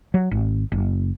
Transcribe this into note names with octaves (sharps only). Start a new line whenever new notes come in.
F#3
G#1
F#1